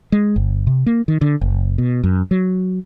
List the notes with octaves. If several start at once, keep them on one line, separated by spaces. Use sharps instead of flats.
G#3
G1
C3
A#3
D#3
D3
F#1
B2
F#2
F#3